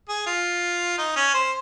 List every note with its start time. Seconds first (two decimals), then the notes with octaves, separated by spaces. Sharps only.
0.09 G#4
0.26 F4
0.98 D#4
1.16 C#4
1.34 C5